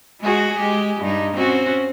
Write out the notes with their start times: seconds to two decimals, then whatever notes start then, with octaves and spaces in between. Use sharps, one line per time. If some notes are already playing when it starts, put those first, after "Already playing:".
0.21 G#3 F#4 G#4
0.58 G#3 G4
1.03 G2 D#4
1.36 C4 C#4 F#4